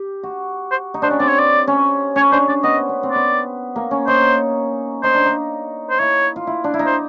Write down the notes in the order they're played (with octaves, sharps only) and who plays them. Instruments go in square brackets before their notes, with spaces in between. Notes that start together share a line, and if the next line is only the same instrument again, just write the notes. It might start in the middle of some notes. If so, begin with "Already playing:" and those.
Already playing: [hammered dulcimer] G4
F#4
[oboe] C5
[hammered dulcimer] D#4
[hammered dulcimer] D4 [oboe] C5
[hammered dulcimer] C#4
[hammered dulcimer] C4 [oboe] D5
[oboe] C#5
D5
[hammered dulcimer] C#4
[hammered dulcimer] C#4 [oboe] C#5
[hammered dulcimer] D4 [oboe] C5
[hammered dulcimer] C#4 [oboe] D5
[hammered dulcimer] B3 [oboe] D#5
[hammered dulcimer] C4
B3
C4
[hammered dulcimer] B3 [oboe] D5
[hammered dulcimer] A#3
C#4
[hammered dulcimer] D#4 [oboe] C5
[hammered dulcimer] D#4 [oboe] C5
[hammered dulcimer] D4
D#4
[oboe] C5
[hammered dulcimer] E4 [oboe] C#5
[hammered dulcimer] F4
E4
D4
E4
D#4
[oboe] C5